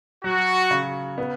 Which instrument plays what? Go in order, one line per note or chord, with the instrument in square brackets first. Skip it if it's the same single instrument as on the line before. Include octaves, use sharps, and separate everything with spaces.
[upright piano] F#3 [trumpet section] F#4
[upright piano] C#3
B3